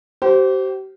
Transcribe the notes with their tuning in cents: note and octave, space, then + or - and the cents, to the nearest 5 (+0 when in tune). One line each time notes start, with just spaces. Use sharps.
G4 -40 C5 +0